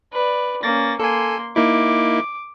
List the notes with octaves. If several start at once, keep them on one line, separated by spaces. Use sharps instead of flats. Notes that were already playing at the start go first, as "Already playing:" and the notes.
B4 D5
A#3 C#4 A6 A#6
A#3 A4 G#5 C6
A#3 D#4 E4 D6